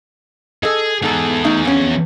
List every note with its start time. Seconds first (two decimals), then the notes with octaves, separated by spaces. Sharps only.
0.63 G#4 A4 D#5
1.02 E2 G#2 G#4 A4 A#5
1.45 A3 D#4 D#5
1.65 F2 C#4